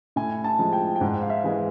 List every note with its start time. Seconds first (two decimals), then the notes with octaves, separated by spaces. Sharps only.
0.16 A2 G#5
0.44 A5
0.59 F3 G#3
0.73 G5
0.96 G5
1.01 G#2 F#5
1.22 F5
1.30 E5
1.44 E3 G#3